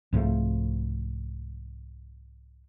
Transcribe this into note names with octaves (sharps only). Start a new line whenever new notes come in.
C2 G#2 F3 A3